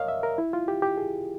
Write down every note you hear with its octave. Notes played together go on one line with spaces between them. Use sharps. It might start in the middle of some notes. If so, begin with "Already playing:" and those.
Already playing: A#4 C#5 D#5 F5
E5
A#4
E4
F4
G4
G4
G#4